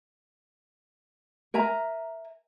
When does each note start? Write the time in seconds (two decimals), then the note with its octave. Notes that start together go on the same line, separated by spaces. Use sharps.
1.54 A#4 E5 G#5 A#5